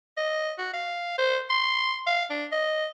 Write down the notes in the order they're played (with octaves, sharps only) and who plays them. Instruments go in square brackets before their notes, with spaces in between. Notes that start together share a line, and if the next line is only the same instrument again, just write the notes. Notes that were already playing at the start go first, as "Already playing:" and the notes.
[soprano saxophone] D#5
F#4
F5
C5
C6
F5
D4
D#5